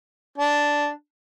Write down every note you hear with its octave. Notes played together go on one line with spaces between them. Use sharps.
D4